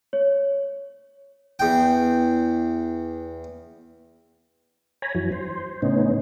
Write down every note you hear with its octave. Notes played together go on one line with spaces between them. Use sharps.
C#5
E2 G5
C#5 G#5 A#5 B5
F#2 E3 F#3
C5
A2 C#3 B3 C#4 D#4